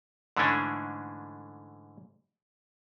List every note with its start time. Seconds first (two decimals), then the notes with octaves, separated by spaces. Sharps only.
0.37 G#2 D3 E3 A3 C#4 D4